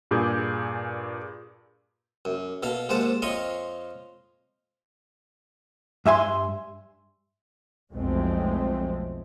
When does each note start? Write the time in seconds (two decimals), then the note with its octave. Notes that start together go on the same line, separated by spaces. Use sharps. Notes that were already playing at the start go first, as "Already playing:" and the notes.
0.11 G2 A#2 G#4 D6 G6
2.25 F#2
2.63 B2 A4 F5
2.89 D#2 G#2 C5 F#5 A5
3.22 F2 C#5 D#5 F5 C6 C#6
6.06 G2 E5 G#5 C6
7.92 B1 F2 G#3 A3 C4